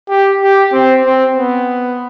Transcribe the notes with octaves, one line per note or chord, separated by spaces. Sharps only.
G4
G4
C4
C4
B3